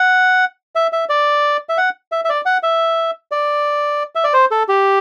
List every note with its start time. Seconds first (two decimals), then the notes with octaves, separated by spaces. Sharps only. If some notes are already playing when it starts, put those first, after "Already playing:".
Already playing: F#5
0.75 E5
0.93 E5
1.09 D5
1.69 E5
1.78 F#5
2.12 E5
2.25 E5
2.29 D5
2.46 F#5
2.63 E5
3.31 D5
4.15 E5
4.24 D5
4.33 C5
4.51 A4
4.69 G4